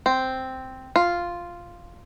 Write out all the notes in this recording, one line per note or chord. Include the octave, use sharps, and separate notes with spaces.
C4
F4